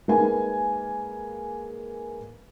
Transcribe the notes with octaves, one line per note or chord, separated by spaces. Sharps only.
G#3 A#3 D#4 A#4 B4 G#5